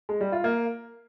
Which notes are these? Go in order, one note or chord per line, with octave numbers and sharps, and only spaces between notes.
G#3
G3
F4
A#3